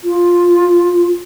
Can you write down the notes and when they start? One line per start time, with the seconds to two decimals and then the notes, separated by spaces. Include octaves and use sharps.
0.04 F4